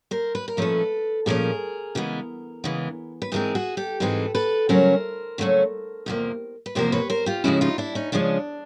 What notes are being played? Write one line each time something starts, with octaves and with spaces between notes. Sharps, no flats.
A#4 C5
B4
A#4
A#2 F3 A3 C#4 A4 B4
A#2 F3 A3 C#4 G#4 A#4
C#3 E3 G#3 B3
C#3 E3 G#3 B3
B4
G#2 E3 G#3 C4 G#4 A#4
F#4 G#4
G4 A4
G#2 E3 G#3 C4 A4 B4
A4 B4
C#3 F#3 A3 C#4 A#4 C5
C#3 F#3 A3 C#4
E2 C3 F3 A#3
B4
E2 C3 F3 A#3 A#4 C5
B4 C#5
A#4 C5
F4 G4
C#3 F3 G#3 C#4 E4 F#4
D#4 F4
D4 E4
C#4 D#4
C#3 F3 G#3 C#4 D4